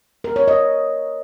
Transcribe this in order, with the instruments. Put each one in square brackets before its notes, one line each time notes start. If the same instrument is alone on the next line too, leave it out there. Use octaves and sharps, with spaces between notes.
[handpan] A#4
C#5
D#5